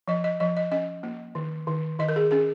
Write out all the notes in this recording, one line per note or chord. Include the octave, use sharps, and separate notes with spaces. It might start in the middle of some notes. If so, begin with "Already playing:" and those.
F3 D#5
D#5
F3 D#5
D#5
C#4 D#5
A#3
D#3
D#3
D#3 D#5
A#4
G#4
C#4 G#4